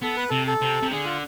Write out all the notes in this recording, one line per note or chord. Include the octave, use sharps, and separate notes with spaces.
B3 A4
B4
C3 A4
A4
C3
C3
D3 G#4
F4